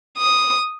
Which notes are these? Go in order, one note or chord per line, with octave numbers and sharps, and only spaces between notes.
D#6